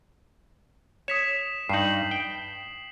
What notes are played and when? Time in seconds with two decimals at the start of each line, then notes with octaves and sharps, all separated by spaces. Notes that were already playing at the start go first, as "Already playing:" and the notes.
1.08 C#5 D#6 B6 E7
1.69 G2 D#4 C7 F#7
2.11 G5